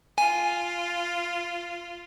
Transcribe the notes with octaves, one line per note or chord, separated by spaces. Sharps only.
F4 G#5